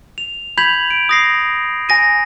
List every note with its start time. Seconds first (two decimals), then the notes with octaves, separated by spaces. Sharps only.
0.18 F7
0.57 B5 G6 G#6 B6 F7 F#7
0.90 D7
1.09 D#6 A#6 C7
1.89 G#5 A#6 D#7